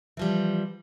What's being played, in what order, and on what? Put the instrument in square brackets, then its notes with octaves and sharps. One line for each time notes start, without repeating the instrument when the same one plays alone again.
[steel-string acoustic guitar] E3 F3 G3